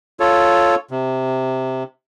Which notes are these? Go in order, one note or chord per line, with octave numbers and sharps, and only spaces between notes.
F4 A4 C#5
C3